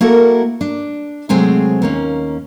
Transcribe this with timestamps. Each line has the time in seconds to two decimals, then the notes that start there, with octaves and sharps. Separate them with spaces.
0.01 A#3 E4 F#4 A4 A#4
0.61 D4
1.29 C3 F#3 G#3 A3 C4 G#4
1.82 D#2 A#3 C#4